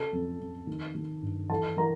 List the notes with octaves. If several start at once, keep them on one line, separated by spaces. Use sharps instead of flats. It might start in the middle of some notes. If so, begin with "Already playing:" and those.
Already playing: C#3 A4 A5
F2
F2
D#3
D#3
G2
E3 A4 A5
E3 A#4 A#5